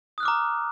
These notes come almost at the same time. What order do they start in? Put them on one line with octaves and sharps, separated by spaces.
D#6 F#6 F6 D6 A#5